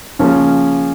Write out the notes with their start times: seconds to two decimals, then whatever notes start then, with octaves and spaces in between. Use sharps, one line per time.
0.19 C#3 F3 A#3 C#4